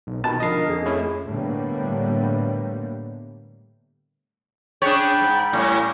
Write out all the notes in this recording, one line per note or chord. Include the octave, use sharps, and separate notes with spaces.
B1
B2 D#3 A5 B5
D3 F3 D#4 A#4 D#5 C7
F2 G#4 A4
A3 C#4 E4
A2 D3 G3 A#3 B3
D4 G#4 C#5 G5 B5 A6
G#2
A2 G3 C#4